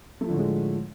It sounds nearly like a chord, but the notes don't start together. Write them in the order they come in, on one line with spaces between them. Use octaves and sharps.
A3 F3 D3 A2 G#3